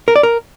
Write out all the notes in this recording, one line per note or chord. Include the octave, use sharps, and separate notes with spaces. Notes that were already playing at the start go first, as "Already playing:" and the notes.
A#4
D5
A#4